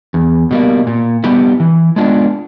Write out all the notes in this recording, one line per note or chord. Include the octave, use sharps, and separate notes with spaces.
E2
B2 G3 A#3
A#2
G3 B3 E4 G4
E3
G#3 B3 D4 F4